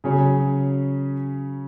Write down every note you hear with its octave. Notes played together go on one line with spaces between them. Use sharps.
C#3 F#3 C#4 G#4